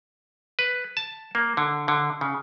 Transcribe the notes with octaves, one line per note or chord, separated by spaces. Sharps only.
B4
A5
A#3
D3
D3
C#3